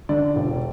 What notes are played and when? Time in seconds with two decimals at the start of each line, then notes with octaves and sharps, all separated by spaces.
0.09 D3 D5
0.36 E1